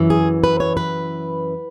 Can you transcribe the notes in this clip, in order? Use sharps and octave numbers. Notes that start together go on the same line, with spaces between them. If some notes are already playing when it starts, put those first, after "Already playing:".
Already playing: F#2 E3
G#4
B4
C#5
B4